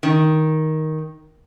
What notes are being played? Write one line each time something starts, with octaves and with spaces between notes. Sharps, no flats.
D#3